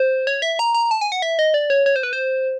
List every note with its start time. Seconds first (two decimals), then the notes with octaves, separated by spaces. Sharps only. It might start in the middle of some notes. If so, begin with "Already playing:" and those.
Already playing: C5
0.27 C#5
0.42 E5
0.59 A#5
0.74 A#5
0.91 A5
1.01 G#5
1.12 F#5
1.22 E5
1.39 D#5
1.54 D5
1.70 C#5
1.86 C#5
1.96 C5
2.03 B4
2.13 C5